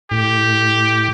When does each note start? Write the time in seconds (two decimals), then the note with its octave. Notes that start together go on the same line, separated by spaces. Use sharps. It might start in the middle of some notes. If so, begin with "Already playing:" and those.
0.11 A2 G4